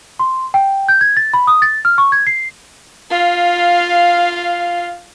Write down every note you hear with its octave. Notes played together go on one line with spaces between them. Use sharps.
C6
G5
G6
G#6
A6
B5
D#6
A6
F6
C#6
G#6
C7
F4 F5